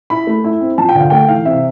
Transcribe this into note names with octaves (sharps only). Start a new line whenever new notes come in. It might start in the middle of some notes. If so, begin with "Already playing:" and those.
E4 B5
A3
E4
C4
F3 A5
G5
D3 F5
A3 G5
E3 F5
C3 E5